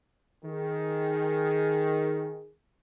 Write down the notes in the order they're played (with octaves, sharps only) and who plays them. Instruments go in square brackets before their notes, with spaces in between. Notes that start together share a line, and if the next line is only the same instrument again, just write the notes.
[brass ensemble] D#3 G#4